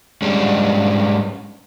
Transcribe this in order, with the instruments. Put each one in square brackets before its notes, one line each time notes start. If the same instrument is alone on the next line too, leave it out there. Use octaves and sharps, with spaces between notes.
[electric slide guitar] G#2 G3 G#3 C#4 D4